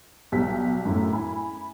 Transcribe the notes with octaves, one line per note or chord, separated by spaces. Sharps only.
B1 G3 B6
F#2 A2
E4 G#5 B5